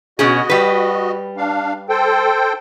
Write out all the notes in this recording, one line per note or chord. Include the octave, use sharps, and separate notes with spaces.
B2 C#4 F#4 G#4 D#5
G3 B4
D4 F5
A4 C5 G5